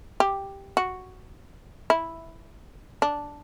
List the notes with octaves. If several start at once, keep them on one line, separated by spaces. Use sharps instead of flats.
G4
F#4
E4
D4